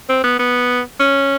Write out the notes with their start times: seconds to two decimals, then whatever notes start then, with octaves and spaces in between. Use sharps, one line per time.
0.09 C4
0.24 B3
0.39 B3
1.00 C#4